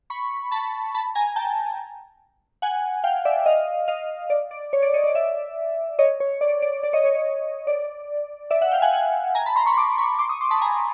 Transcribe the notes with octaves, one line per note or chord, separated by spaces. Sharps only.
B5 C#6
A5 B5
A5 B5
G#5 A#5
G5 A5
F#5 G#5
F5 G5
D5 E5
D#5 F5
D#5 F5
D5
D5
C#5
D5
C#5 D#5
D5
D5 E5
C#5 D#5
C#5
D5
D5
D5
C#5 D#5
C#5
C#5
D5
D5 E5
E5 F#5
F5 G5
F#5 G#5
F#5 G#5
G#5 A#5
A5 B5
A#5 C6
B5 C#6
C6 D6
B5 C#6
C6 D6
C#6 D#6
C6 D6
A5 B5
G#5 A#5